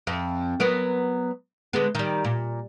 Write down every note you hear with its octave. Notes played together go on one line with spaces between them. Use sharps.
F2
F#3 B3 A#4
D3 G#3 B3
D#3 G3
A#2